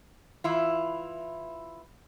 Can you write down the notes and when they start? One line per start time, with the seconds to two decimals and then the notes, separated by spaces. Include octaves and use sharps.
0.44 E3 E4 F4